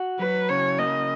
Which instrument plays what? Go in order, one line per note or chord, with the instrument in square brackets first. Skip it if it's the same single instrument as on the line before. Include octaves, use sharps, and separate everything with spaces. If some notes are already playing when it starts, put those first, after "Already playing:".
Already playing: [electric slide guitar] F#4
[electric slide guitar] F#3 [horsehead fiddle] B4
[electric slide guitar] C#3 [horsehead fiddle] C#5
[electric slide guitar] A#3 [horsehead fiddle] D#5